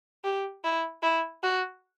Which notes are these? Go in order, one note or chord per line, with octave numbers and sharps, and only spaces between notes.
G4
E4
E4
F#4